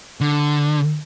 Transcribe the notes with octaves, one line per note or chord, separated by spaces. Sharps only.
D3